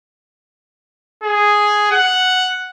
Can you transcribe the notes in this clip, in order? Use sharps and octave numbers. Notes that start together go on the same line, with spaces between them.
G#4
F#5